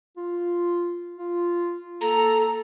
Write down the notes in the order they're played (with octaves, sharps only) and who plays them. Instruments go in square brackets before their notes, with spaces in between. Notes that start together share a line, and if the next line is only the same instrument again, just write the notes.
[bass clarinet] F4
F4
[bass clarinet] A#3 [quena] A4 [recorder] A#5